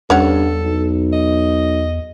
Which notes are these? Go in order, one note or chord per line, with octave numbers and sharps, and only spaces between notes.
E2 G2 C#4 A4 C#5 F#5
B1
D#5